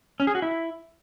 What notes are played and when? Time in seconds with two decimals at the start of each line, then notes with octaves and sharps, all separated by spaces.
0.20 C#4
0.27 G#4
0.35 F#4
0.42 E4